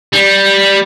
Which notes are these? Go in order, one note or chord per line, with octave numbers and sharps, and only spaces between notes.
G3